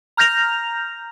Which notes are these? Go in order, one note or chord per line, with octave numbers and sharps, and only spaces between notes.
A#5 F6 G6 A#6 F7